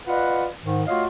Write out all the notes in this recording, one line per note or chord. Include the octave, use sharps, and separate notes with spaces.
F4 B4 D5 D#5 F5 F#5
G#2 D#3
A3 F4 F#4 C#5 D#5 F5